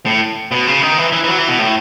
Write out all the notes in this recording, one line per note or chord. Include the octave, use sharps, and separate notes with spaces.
A2
B2
C#3
D#3
E3
E3
E3
F#3
E3
B2
A2